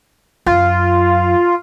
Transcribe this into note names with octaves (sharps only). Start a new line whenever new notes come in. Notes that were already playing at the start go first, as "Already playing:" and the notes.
F#2 F4